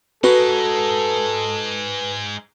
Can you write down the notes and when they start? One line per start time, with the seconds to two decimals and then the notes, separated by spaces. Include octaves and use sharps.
0.24 G#3 D#4 F#4 A4 B4